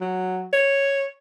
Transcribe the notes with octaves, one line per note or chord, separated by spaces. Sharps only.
F#3
C#5